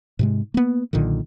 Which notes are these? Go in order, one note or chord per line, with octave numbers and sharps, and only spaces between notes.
G#2 C3 G#3
A#3 B3
B1 A#2 D3 D#3